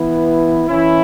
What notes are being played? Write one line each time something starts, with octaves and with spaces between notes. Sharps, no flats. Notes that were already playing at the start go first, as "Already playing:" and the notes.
Already playing: E3 B3 E4
E3 C#4 E4